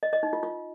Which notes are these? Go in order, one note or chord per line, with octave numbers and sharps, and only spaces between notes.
D#5
D#5
D#4
F4
F4